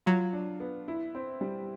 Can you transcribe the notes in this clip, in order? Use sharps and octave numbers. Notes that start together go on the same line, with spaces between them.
F#3 F4
D4
B3
E4
C4
G3